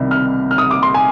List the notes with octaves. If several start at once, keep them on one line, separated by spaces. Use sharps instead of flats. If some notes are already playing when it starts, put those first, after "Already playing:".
Already playing: C2 C3 D#3 G3
F6
F6
D#6
D6
C6
G#5